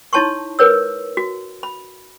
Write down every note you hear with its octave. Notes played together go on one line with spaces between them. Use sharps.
D#4 E4 C#5 A5 C6 C#6
A#4 B4 C#5 E6
F#4
B5